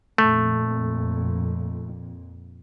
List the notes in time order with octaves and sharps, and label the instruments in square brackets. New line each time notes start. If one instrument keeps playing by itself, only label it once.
[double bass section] F2 A#2 [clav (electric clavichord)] A3